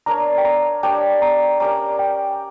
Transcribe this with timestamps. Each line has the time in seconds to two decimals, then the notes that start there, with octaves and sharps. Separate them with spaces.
0.06 D4 A#4 C#5 A#5
0.38 G5
0.45 A#5
0.83 D4 G4 A#4 C#5 G5
1.22 A#5
1.60 C#4 G4 A#4 D5 A#5
1.99 G5